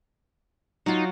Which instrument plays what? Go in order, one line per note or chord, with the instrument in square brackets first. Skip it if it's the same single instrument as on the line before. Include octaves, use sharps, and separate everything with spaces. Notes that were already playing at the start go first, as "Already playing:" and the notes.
[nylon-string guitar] F#3 F4 [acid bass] D#4